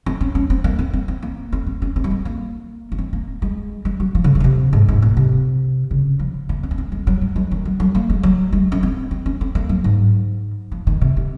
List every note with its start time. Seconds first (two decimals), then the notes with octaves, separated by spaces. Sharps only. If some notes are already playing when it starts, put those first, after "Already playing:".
0.06 C4
0.21 C#4
0.35 C#4
0.50 C4
0.64 A#3
0.79 C4
0.93 C4
1.08 C4
1.22 A#3
1.52 C4
1.67 C4
1.82 C#4
1.96 C4
2.04 F#3
2.11 G#3
2.25 A#3
2.92 A#3
2.98 C4
3.13 A#3
3.42 G#3
3.85 G#3
4.00 F#3
4.15 F3
4.24 C#3
4.35 C#3
4.40 A#2
4.44 C3
4.73 G#2
4.88 G#2
5.02 A#2
5.17 C3
5.91 C#3
6.19 F3
6.49 A#3
6.63 C4
6.71 A#3
6.78 C4
6.92 G#3
7.07 F#3
7.21 G#3
7.36 F#3
7.51 D#3
7.65 F#3
7.80 F#3
7.95 A#3
8.10 G#3
8.23 F#3
8.52 G#3
8.72 C#4
8.83 C4
9.11 C4
9.26 C#4
9.41 C4
9.55 A#3
9.69 F#3
9.84 G#2
10.72 F3
10.87 D#3
11.01 C3
11.17 C3